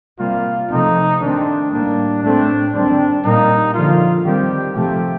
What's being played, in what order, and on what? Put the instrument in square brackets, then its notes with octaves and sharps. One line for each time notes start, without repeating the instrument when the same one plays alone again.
[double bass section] C3 G3 A#3 [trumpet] F4
[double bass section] C3 F3 A3 C4 [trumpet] D#4
[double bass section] D#3 A3 C4 [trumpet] D4
[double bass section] A2 G3 A#3 [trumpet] D4
[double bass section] A2 A3 C4 [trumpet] D4
[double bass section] D#3 G3 C4 [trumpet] D4
[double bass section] A#2 G3 A#3 [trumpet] D#4
[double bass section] D3 F3 A#3 [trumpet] F4
[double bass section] D#3 G3 C4 [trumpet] G4
[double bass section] C3 F3 A3 [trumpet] G4